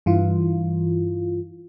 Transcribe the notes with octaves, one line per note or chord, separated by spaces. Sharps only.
G2 E3 F4